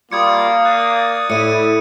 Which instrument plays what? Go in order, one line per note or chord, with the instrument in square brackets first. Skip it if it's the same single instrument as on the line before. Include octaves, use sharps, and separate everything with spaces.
[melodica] G3 F4 D6 [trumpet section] A#3 [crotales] D#6 G#6 C#7
[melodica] D5 D#6 [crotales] F#6
[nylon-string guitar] A2 [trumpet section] E4 [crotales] C#7 D#7